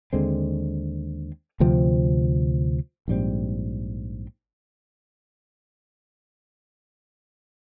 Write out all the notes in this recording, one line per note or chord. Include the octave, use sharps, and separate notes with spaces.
D#2 D3 G#3 C4
D2 C3 F3 C4
A#1 G#2 G3 C4